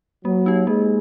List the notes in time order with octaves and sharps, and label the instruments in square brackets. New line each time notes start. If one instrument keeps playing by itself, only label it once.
[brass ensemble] F#3 [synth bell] A#3
[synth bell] D#4 G4
[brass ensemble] G#3 [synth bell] A#3